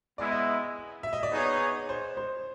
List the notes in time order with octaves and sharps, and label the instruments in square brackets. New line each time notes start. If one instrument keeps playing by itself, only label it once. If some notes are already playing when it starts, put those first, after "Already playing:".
[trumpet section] G#3 B3 E4 [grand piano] D5
[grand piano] D#5
E5
D#5
D5
[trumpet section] B3 D#4 G#4 C#5
[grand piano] C5
C5